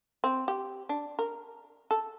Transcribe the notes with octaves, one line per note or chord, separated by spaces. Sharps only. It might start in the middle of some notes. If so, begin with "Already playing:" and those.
C4
G4
D4
A#4
A4